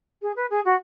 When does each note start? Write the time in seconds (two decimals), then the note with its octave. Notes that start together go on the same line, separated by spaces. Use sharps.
0.22 G#4
0.36 B4
0.50 G#4
0.65 F#4